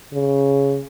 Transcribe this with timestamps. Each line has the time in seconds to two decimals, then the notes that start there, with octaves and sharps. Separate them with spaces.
0.13 C#3